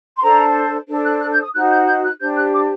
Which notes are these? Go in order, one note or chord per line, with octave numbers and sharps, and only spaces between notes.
C6
D4 A4 C5 A#5
D4 A4 C5
F#6
F#6
G6
D#6
D#4 F#4 C5 F#6
G6
G6
F#6
D4 G4 C5 G6
F#6
D6